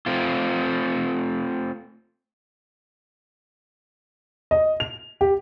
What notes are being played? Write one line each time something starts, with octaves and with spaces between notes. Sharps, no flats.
A3 C4 F4
D#5
F7
G4